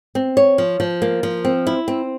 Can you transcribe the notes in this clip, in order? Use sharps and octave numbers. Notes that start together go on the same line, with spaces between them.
C4
C#5
F3
F3
A#3
F3
C4
E4
C4